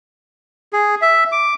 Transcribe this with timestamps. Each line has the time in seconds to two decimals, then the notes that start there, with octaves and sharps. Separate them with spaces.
0.73 G#4
1.02 E5
1.32 D6